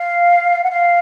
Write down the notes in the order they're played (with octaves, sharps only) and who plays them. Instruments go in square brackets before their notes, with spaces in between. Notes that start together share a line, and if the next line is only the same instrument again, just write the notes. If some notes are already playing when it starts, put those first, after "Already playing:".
Already playing: [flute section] F5
F#5
F5